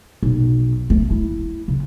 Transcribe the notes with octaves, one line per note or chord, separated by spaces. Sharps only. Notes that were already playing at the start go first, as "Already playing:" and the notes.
B1
A3
E4
C#3